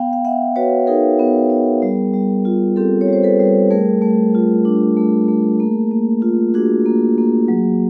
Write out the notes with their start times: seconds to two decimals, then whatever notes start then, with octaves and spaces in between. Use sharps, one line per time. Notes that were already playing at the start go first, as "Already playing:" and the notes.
Already playing: B3 F5 G5
0.13 F5
0.25 B3 E5 F#5
0.56 F#4 B4 C#5
0.87 D#4 G#4 A#4
1.19 B3
1.50 B3
1.82 G3
2.14 G3
2.45 F4
2.76 C4 G4 A4
3.01 C#5
3.08 G3 C5
3.23 A4 B4
3.39 G3
3.71 A3 G#4 A#4
4.02 A3
4.35 F4
4.65 D4
4.97 A3
5.28 A3
5.60 A#3
5.91 A#3
6.22 F4
6.54 D4 F#4 G#4
6.86 A#3
7.18 A#3
7.48 F#3